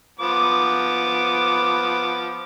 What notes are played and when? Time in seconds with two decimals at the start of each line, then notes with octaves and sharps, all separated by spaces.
0.20 F3 B3 D6